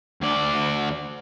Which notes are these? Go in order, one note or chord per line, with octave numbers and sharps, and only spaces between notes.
D2 D5